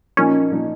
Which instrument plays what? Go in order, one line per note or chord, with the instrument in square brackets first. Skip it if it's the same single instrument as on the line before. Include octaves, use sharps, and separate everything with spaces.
[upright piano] A#2 F3 A#3 D#4 [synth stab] C#4
[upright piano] A#2 F3 A#3 D#4